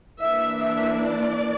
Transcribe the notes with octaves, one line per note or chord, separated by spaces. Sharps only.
E3 A#3 D4 E5
E5
D5